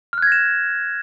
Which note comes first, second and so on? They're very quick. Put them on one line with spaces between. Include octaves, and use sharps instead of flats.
F6 F#6 G#6 A#6 E7